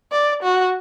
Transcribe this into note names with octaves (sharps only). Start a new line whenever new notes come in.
D5
F#4